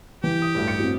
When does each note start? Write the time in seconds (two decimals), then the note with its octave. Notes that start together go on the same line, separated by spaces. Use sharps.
0.24 E3 G4
0.42 D#6
0.55 A1 D2 G2
0.68 C#7
0.80 C4 F#4